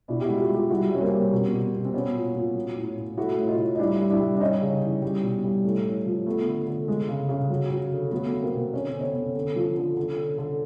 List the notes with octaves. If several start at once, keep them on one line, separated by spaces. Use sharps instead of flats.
B2 D4 E4
G4
G#3 E4 F#4
F4 G4
G#3 F4 G4
G3 E4 F#4
G3 C#4
A#3 C4
G3
B2
B2
B2
C4
F#3 B3 C#4
A#2
A#2
F#3
A2
A2
A3 E4 F#4
A2
D#4 F4
A2
D#4
G3 D4 E4
G3
D4 E4
G3
D4
G3 C#4 D#4
C#3
E3
G3
B2
G3
A2 A3
A2
F3
A3 B3
D3
D3
G#3
C#3
C#3
F#3
F#3
D3
F#3 A3 B3
F#3
A#3 C4
B2
D3 C#4
C4
D3
B3 C#4
D3
D3
F3
D3
D3
D3
D3